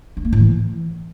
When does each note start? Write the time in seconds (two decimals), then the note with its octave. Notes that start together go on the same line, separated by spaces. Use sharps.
0.17 D4
0.25 A#3
0.33 A2
0.40 E3